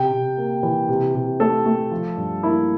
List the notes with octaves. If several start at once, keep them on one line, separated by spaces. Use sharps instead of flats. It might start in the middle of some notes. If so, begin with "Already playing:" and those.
Already playing: C3 G5
C3
A#3
E3
C3
C3
A3 A4
A3
F3
G2
A#3 E4